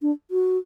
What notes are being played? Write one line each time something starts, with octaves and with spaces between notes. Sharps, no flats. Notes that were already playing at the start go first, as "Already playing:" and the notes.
D4
F#4